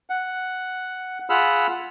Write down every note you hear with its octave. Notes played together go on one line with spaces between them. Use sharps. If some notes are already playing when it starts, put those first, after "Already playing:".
F#5
F4 G#4 F#5 B5 E6 F6